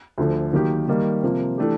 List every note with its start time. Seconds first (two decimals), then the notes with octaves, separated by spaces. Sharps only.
0.18 D2 D3 F3
0.53 D#3 F#3 A#3 D#4 G4
0.88 D#3 G3 A#3
1.23 C3 F3 A#3
1.58 E3 A3 D4 G4